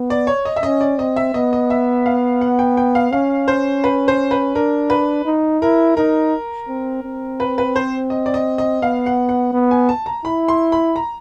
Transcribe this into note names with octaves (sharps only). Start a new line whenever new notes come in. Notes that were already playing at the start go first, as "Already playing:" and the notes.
Already playing: B3
D5
C#5
D#5
E5
C#4 D#5
D5
C4 D#5
E5
B3 D#5
D#5
E5
F5
F#5
G5
G5
F5
C#4 F5
C5
B4
C5
B4
D4 A#4
B4
D#4
E4 A#4
D#4 A#4
C4
C4
B4
B4
C5
D#5
D5
D#5
D#5
B3 F5
F#5
F#5
B3
G#5
A5
A#5
E4 B5
C6
B5
A#5